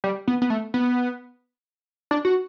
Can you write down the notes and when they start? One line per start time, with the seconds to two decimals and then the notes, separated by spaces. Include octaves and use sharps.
0.04 G3
0.28 B3
0.42 B3
0.50 A3
0.74 B3
2.11 D4
2.25 F#4